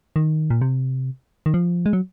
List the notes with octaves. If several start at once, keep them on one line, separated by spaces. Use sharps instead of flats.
D#3
A#2
C3
D#3
F3
G#3
F#3